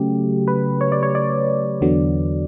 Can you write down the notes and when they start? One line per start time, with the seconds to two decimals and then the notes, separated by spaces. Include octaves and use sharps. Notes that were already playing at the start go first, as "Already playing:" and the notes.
Already playing: C#3 F#3 A3 G4
0.48 B4
0.81 C#5
0.92 D5
1.03 C#5
1.15 D5
1.81 E2 D3 F#3 B3